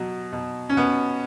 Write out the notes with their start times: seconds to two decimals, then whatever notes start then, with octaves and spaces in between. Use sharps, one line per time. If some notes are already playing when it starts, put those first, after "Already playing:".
Already playing: B2 F#3
0.32 B2
0.69 C#4
0.77 B2 B3